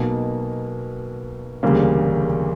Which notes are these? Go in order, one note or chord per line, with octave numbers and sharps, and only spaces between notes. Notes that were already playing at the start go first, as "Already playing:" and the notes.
Already playing: B1 B2 A#3
E1 D2 C#3 G3 A#3